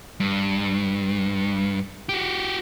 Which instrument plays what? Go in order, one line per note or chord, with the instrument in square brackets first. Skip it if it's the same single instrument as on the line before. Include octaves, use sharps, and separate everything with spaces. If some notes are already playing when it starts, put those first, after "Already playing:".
[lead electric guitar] G2
F#4 G4